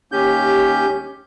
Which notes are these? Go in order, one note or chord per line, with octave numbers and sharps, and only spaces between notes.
D#2 C#4 G4 G6